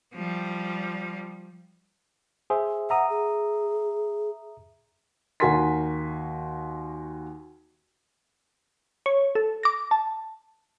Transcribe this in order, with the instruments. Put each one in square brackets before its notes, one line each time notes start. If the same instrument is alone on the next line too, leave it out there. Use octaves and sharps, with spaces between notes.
[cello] F3 G3
[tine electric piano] G#4 C5 E5
[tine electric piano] E5 A#5 D#6 [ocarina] F#5
[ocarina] G#4
[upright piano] D#2 F#4 A#4 G#5 C6 B6
[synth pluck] C#5
A4
D6 A#6
A5